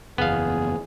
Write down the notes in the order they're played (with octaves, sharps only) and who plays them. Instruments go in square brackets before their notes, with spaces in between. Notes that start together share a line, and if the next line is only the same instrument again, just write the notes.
[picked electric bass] F#1 E2 [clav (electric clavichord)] B3 F5 [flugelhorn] G#4